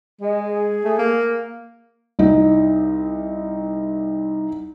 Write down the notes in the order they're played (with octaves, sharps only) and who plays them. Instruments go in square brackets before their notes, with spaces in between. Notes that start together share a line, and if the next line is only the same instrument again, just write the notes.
[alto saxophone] G#3 [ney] D#5
[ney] G#4
[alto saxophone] A3
A#3
[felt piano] C2 D#4